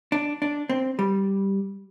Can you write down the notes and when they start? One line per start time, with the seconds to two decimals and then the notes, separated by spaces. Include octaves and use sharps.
0.12 D4
0.42 D4
0.69 C4
0.99 G3